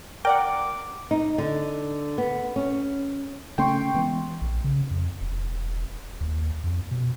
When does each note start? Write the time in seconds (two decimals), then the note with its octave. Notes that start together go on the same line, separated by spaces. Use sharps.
0.25 A#4 D5 F#5 G5 D6
1.11 D#4
1.38 D3
2.18 B3
2.56 C#4
3.58 C#3 A3 C#4 G5 C6 C#6
3.94 E3 G#3 B3
4.42 A#1
4.64 C#3
4.91 F2
5.21 E1
6.21 D#2
6.64 F2
6.91 B2